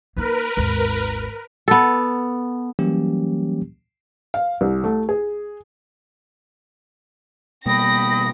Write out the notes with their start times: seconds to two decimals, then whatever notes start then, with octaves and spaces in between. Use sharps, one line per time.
0.16 A#3 D#4 A#4 B4
0.57 G#1 D#2
1.68 B3 A4
2.79 E3 F#3 G3 A#3 C#4 G4
4.34 F5
4.61 C2
4.84 A3
5.09 G#4
7.66 B2 G3 A#3 G5 B5 D#6 A#6